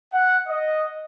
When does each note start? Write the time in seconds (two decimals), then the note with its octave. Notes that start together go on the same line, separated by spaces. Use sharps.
0.12 F#5
0.47 D#5